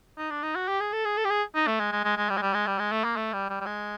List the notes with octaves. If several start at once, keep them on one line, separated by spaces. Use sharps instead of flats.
D#4
D4
D#4
F#4
G4
G#4
A4
G#4
A4
G4
G#4
D#4
A3
G#3
G#3
G#3
G#3
G3
G#3
G3
G#3
G3
G#3
A3
A#3
A3
G3
G3
G3
G#3